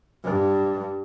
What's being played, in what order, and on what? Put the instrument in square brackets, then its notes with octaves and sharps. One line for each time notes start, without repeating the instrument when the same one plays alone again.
[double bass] G2